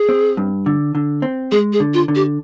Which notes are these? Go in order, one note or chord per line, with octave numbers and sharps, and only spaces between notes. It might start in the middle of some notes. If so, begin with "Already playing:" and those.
Already playing: G#4
C4
G2
D3
D3
C4
G#3 G#4
G#4
D3
F4
D3
G4